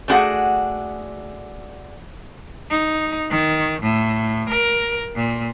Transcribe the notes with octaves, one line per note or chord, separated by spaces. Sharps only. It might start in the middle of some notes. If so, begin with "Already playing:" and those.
A3 D4 F4 F#4 G#4 F#5
D#4
D#3
A2
A#4
A#2